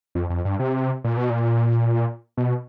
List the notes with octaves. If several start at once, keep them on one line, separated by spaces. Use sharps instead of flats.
F2
F2
G2
C3
A#2
B2
A#2
B2